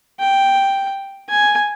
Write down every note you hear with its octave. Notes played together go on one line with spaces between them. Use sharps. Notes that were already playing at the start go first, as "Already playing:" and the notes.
G5
G#5